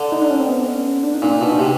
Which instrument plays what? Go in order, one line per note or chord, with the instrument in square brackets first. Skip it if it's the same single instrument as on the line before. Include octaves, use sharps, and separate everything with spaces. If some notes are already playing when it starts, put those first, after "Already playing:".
Already playing: [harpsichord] D3
[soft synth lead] D#4
D4
C#4
C4
B3
C#4
D4
D#4
[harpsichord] A#2 [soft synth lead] D4
[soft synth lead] D#4
[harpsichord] B2
[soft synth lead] D4
[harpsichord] C3 [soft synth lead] D#4